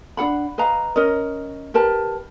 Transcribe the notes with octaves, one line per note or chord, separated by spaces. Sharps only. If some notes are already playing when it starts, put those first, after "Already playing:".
D4 G#4 F#5 B5
B4 D#5 F5 A#5
C#4 A#4 D#5
G4 A#4 B4 A5